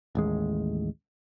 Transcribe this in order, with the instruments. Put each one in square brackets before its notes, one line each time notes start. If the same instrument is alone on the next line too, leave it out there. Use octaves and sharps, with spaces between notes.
[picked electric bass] A1 D#2 G#3